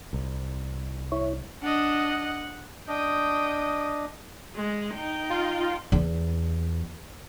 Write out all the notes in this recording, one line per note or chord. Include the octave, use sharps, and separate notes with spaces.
C2
E4 C#5
D4 D#5 F#5
D4 D#5 G5 D#6
G#3
D#4 G5
F4
E2